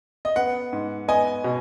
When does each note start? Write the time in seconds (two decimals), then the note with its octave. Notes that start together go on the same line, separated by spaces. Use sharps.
0.25 D#5
0.36 B3 F#5
0.73 G#2
1.08 B3 D#5 G#5
1.44 B2